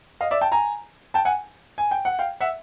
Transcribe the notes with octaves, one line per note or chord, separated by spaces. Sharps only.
D#5 F5
D5 E5
G5 A5
G#5 A#5
G5 A5
F#5 G#5
G#5
G5
F#5
F5 G5
E5 F#5